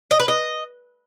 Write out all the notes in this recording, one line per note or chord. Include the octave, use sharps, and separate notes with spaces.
D#5
B4
D#5